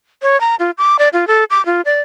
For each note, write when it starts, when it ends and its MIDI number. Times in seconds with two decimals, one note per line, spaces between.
0.22 0.39 73
0.41 0.55 82
0.59 0.71 65
0.78 0.97 86
0.99 1.09 74
1.13 1.27 65
1.27 1.44 69
1.50 1.64 86
1.66 1.81 65
1.85 2.01 74